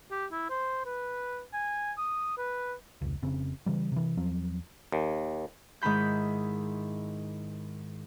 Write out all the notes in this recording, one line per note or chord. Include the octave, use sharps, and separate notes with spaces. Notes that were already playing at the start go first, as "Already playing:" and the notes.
G4
E4
C5
B4
G#5
D#6
B4
F1 C#2
F1 C#3 C4
C#3 E3 G3
C3 E3
E2 F3 F#3 C4
D#2
G#2 D#3 E4 B5 G6